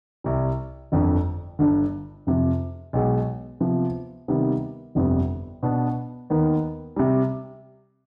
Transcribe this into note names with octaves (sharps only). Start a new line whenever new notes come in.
C2 C3 G3
G1 F2 D3
G1 G2 D3
F2 C3 F3
B1 B2 G#3
C3 F3 B3 F4
C3 D#3 G3 B3
G1 F2 C3 G3 B3
B2 B3 D4
D#2 D#3 B3
C3 G3